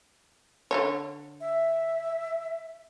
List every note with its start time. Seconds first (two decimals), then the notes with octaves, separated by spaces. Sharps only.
0.71 D3 G#3 C#5
1.41 E5